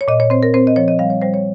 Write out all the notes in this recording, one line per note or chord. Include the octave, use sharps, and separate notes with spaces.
C#5
A#2 D#5
C#5
C4 C5
A#4
C4 C5
D#5
F3 C#5
D#5
G3 F5
C#5
G3 C5
C#5